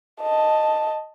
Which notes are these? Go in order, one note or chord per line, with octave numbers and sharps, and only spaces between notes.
D#5 A5